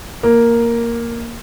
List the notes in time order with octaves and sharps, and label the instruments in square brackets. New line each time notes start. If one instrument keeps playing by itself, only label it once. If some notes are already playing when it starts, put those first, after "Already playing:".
[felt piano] A#3